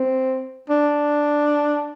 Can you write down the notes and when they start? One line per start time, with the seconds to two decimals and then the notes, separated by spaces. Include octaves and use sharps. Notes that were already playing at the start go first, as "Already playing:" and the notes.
Already playing: C4
0.70 D4